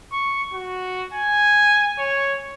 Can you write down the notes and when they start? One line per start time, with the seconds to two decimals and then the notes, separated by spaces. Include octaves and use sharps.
0.12 C#6
0.54 F#4
1.14 G#5
1.99 C#5